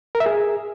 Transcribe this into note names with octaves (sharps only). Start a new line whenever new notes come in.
A#4
E5
G#4